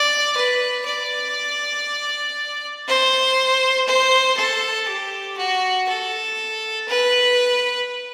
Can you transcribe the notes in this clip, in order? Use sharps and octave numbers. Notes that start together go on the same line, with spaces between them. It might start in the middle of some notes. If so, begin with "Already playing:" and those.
Already playing: D5
B4
D5
C5
C5
A4
G4
F#4
A4
B4